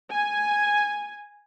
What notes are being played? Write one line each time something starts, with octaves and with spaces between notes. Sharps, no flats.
G#5